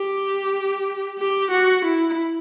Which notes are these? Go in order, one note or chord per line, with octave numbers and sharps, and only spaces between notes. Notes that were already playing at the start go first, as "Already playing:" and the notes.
Already playing: G4
G4
F#4
E4